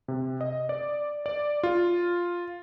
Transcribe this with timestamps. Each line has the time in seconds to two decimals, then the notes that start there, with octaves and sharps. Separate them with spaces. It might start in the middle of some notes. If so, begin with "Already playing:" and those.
0.08 C3
0.41 D#5
0.69 D5
1.26 D5
1.63 F4